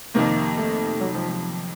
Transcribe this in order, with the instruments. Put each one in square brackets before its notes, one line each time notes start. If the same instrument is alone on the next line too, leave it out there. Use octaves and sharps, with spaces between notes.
[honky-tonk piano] F2 C3 D#3 [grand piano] A#3
[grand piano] A3
F#3
F3
F3